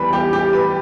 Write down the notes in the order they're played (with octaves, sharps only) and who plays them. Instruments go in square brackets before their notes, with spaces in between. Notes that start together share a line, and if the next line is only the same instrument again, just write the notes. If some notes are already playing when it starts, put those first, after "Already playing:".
Already playing: [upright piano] E2 E3 G3 B4 B5
G4
G4
B4